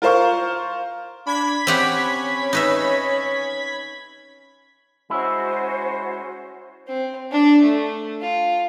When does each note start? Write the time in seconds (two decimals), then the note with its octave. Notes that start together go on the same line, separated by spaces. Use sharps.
0.02 F4 A#4 C5 F5 C#6
1.26 D4 B5 G#6 B6
1.67 C4 C#4 G4 F#5
2.53 D#4 B4 E5
5.10 G#3 C#4 E4 F#4 C5
6.88 C4
7.32 D4
7.62 A3
8.21 F4